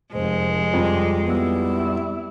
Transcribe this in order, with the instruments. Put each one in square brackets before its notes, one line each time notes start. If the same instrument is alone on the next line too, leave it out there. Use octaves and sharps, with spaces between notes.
[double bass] F1 [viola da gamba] G#3 [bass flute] C5
[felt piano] F2 [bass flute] G3
[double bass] G3 E4 [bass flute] B3